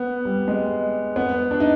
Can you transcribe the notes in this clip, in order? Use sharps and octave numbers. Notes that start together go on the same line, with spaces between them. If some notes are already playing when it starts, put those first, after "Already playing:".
Already playing: B3
G3
G#3
B3
D4
D#4